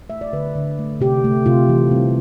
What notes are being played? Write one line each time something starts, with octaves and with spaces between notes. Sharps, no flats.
A3 E5
D5
D3 B4
D3
A3
C3 G4
A3
C3 F4
E3
G3 C4